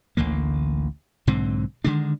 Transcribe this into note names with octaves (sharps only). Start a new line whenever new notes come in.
A1 D2 D3 A#3
B1 G#2 D3 C4
D3 D#3 G#3 D4